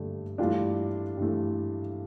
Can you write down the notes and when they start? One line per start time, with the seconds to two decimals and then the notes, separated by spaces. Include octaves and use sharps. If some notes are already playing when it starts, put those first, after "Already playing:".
Already playing: G2 D3 A3
0.38 G2 E3 A3 D4 F4
1.17 G2 E3 A3